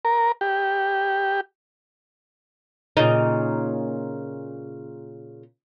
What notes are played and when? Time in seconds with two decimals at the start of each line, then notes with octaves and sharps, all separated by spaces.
0.05 A#4
0.41 G4
2.97 A#2 C#3 D#4